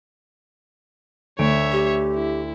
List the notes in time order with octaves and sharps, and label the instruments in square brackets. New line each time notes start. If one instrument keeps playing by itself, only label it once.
[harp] D2 A3 D7 [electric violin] C#5 E5
[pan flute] G4
[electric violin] E4